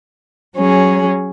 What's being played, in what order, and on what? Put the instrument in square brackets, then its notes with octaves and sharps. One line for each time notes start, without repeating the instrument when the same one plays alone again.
[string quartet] F#3 C#4 G#4